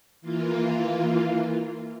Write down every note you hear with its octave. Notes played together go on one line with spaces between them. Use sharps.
E3 A#3 F4